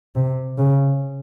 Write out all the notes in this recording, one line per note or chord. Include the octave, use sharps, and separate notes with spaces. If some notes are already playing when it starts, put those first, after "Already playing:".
C3
C#3